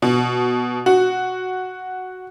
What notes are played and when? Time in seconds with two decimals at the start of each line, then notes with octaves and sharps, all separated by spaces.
0.02 B2
0.86 F#4